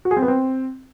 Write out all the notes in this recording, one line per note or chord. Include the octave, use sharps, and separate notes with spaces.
F#4
G#4
C4
B3
C4